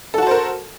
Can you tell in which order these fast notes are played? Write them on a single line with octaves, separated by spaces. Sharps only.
A4 F#4 A5 C5 A#4